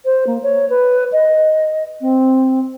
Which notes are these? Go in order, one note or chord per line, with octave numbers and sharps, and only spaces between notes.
C5
A#3
C#5
B4
D#5
C4